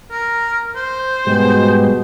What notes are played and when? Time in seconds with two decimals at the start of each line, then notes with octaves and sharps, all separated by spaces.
0.11 A#4
0.76 C5
1.27 G#2 B2 G3 G#3